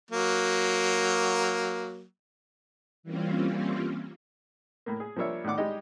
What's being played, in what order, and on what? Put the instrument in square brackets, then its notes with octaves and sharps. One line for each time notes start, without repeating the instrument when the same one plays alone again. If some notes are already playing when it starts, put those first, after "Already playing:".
[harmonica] F#3 A#3
[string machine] E3 G3 A#3 C4 C#4 F4
[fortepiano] A2 A#3
G#4
F3 G3 A#3 D4 C#5 E5
A2 D#3 D4 F#5 D6
G3 G#3 D#4 G4 D#5